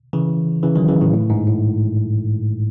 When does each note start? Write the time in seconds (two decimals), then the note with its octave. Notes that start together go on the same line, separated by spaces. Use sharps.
0.13 C#3 E3
0.63 C#3 E3
0.76 D#3 F#3
0.88 C#3 E3
1.01 A2 C#3
1.13 A2
1.30 G#2
1.47 A2